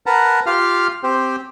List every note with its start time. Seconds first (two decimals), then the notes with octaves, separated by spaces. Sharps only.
0.06 A#4 B4 F#5 A5 A#5
0.46 F4 G4 F5 F6
1.04 C4 G4 C5